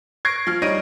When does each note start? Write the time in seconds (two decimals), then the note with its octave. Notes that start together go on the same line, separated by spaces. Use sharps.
0.25 C#6 G#6 A#6 C7 D7
0.47 F3 F6
0.62 G3 D#4 C#5 A#6 D7 D#7